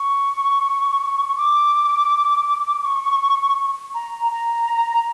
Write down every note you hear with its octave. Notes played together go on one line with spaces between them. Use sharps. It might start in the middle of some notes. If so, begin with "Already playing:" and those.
Already playing: C#6
D6
C#6
A#5
A#5